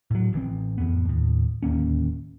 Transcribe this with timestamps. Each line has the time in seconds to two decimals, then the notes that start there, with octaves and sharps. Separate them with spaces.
0.11 A2 F#3
0.33 A1 E3 C4
0.78 A1 F2 B3
1.05 D#2 A2
1.63 D1 D#2 A#3 C#4